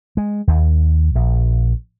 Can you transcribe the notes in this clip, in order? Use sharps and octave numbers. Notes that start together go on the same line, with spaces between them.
G#3
D#2
A#1